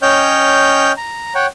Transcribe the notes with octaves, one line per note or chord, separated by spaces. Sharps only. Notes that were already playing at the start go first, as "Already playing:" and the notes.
C#4 C#5 D#5 G5 F6 G6
A#5
C#5 F#5 G5